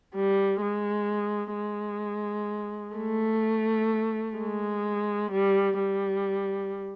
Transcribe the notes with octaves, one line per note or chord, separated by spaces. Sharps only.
G3
G#3
G#3
A3
G#3
G3
G3